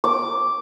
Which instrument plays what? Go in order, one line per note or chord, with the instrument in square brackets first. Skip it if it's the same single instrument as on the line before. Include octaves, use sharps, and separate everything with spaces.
[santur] D6